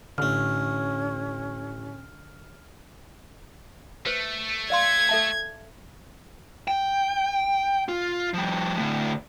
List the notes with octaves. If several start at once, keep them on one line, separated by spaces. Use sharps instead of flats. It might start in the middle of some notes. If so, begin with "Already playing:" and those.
A1 D3 A3 C#4 F6
A3 B4 C5
D5 F5 C6 G#6
A4 E5 A5
G5
F4
F3 G3
A2 D3